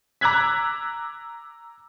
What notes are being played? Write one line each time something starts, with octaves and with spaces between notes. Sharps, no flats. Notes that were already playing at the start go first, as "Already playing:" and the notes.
A#5 D6 E6 F#6 G#6 B6